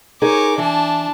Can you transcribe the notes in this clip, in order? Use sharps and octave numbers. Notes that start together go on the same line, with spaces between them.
D#4 G#4 A#4 C#5 D6
E3 D4 A5